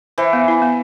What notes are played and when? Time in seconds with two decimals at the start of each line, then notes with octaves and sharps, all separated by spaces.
0.18 E3 C5
0.33 B3
0.48 E4
0.62 B3